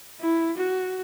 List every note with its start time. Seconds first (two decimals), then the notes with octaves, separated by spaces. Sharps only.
0.19 E4
0.57 F#4